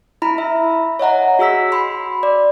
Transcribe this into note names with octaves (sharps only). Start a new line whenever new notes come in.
E4 A#5 B5
E5
C#5 D#5 F#5 A#5
F#4 G#4 E6 B6
B5 C6
D5